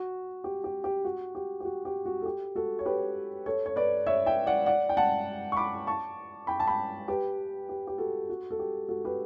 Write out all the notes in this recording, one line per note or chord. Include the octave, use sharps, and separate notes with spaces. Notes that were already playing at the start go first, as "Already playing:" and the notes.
Already playing: F#4
G4
G4
G4
F#4
G4
G4
F#4
G4
F#4
A4
G4
F#4 A4
C#5
G4 B4
A4 C#5
C#5
B4 D5
C#5 E5
E5 G5
D5 F#5
D5 F#5
G5
F#5 A5
C#6
B5 D6
A5 C#6
G5 B5
A5
G5 B5
G4 B4
G4
G4
F#4 A4
F#4
A4
G4
F#4 A4
G4 B4